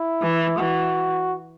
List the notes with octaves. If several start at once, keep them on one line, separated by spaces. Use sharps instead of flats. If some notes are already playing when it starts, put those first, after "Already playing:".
Already playing: E4
E3
E3 F#4